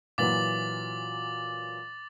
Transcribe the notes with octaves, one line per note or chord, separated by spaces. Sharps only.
A#2 E3 F#3 D6 A6 F#7